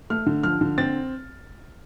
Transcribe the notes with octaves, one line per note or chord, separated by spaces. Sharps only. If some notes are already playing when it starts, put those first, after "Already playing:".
A3 F6
D3
F3 F6
D3
C4 A6